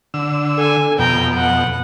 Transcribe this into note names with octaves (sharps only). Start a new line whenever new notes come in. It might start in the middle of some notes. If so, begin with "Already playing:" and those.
D3 E6
A4 G#5
F2 B2 G5 A#5
F#5